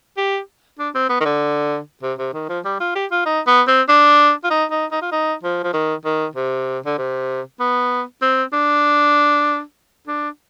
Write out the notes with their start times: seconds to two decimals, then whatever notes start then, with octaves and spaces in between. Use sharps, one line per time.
0.17 G4
0.79 D4
0.95 C4
1.09 B3
1.20 D#3
1.25 D3
2.03 C3
2.19 C3
2.33 D#3
2.49 F3
2.65 G3
2.80 F4
2.95 G4
3.11 F4
3.26 D#4
3.47 B3
3.67 C4
3.89 D4
4.44 F4
4.50 D#4
4.71 D#4
4.91 D#4
5.02 F4
5.12 D#4
5.43 F3
5.64 F3
5.73 D#3
6.05 D#3
6.35 C3
6.86 D3
6.98 C3
7.60 B3
8.22 C4
8.53 D4
10.07 D4